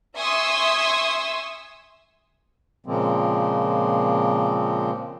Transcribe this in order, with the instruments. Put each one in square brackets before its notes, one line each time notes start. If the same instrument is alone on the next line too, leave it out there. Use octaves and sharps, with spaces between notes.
[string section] E5 G#5 C6 C#6 D#6 E6
[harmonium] A#2 C#3 F3 G#3 A#3 C4